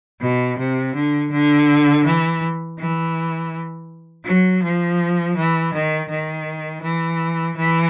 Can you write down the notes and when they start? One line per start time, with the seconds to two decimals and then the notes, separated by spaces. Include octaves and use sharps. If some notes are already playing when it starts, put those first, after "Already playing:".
0.20 B2
0.58 C3
0.94 D3
1.31 D3
2.04 E3
2.78 E3
4.24 F#3
4.62 F3
5.36 E3
5.72 D#3
6.08 D#3
6.82 E3
7.56 E3